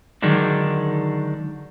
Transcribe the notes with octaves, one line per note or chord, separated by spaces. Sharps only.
D3 D#3 F#3 G#3 D4